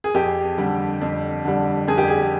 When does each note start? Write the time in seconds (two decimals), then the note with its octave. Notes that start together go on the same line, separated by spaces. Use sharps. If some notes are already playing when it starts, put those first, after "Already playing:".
0.04 G#4
0.14 F2 G4
0.58 D3 G3
1.01 F2
1.45 D3 G3
1.87 F2 G#4
1.98 G4
2.08 G#4